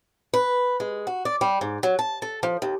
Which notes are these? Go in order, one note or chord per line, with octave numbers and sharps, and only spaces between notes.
B4
G#3
F#4
D5
G3
G#2
F#3
A5
A4
F3
D#2